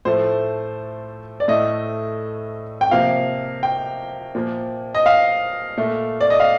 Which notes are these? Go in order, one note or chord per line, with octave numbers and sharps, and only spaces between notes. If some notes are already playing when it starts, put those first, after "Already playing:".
A2 F3 A3 C5
D5
A2 A3 D#5
G5
C3 F3 A#3 F5
G5
A#2 F3 A#3
D#5
F5
A#2 A3
D5
D#5
F5